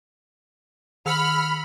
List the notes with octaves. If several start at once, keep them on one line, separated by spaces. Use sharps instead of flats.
D#3 B5 E6 F6 C#7